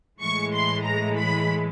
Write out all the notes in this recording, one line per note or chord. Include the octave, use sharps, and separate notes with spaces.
A2 E3 G#3 C#6
C6
A#5
B5